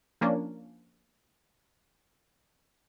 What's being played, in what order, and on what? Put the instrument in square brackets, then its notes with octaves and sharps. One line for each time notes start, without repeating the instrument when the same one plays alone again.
[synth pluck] F3 A#3 C#4 D4